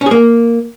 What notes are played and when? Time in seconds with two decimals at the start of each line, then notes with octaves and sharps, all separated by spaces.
0.01 C#4
0.06 G#4
0.11 A#3